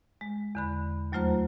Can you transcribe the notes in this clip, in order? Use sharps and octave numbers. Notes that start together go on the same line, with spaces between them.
G#3
E2 D3 B5
D#2 F#3 A3 F4 C5 A#5